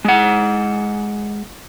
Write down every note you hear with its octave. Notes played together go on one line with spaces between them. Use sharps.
G#3 F#5